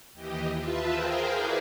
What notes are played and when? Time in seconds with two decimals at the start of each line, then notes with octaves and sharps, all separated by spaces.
0.14 D#2 E3 G4 D#5
0.56 F4 B4 E5 A5
0.91 G#4 A#4 C5 F5 G5
1.29 E4 F#4 G#4 B4 D5